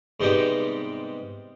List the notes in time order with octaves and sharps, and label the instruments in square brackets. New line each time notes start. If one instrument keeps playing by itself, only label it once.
[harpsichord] G#2 C3 G3 B3 D#4 G4